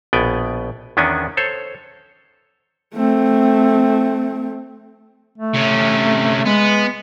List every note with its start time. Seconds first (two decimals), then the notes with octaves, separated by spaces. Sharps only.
0.13 A#1 B2 B3 D5 G5 G#5
0.97 E2 D#3 B3 C#4 D4 G#5
1.37 A4 C5 C#5
2.94 A3 C4
5.38 A3
5.54 C3 C#4
6.46 G#3 B3